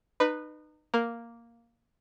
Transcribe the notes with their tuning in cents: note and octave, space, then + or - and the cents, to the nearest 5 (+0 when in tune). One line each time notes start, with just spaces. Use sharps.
D#4 -30 B4 +0
A#3 +0 A#4 +0